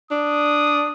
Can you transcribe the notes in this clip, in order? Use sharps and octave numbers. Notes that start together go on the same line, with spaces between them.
D4 D#6